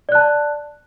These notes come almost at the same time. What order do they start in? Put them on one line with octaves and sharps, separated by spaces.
D5 F#6 A5